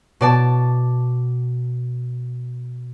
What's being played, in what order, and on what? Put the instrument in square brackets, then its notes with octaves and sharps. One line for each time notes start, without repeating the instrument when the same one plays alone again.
[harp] B2 D5 A5